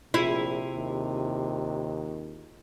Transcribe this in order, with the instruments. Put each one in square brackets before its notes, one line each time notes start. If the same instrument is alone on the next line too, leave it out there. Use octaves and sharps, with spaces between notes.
[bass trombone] A#1 [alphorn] C3 [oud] E4 [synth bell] F4 G#4
[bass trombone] D#2